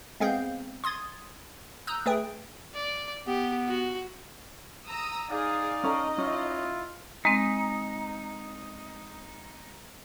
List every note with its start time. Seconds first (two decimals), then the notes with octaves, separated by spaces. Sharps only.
0.20 G#3 B3 C4 G#4 F5 G6
0.84 C6 D#6 G#6 A6
1.87 A#5 D#6 E6 F#6 G6
2.06 A3 G#4 B4 G5
2.75 D5
3.27 B3 G4
3.68 F#4
4.87 A#5 D#6 E6
5.30 D#4 G#4 D5 F5
5.83 C#4 A4 D#5 A#5
6.18 C#4 E4 F4
7.25 G#3 C4 D#4